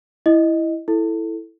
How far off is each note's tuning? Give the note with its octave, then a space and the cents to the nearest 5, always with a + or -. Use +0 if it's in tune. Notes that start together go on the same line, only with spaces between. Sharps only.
E4 +0 D#5 +0
E4 +0 A4 +0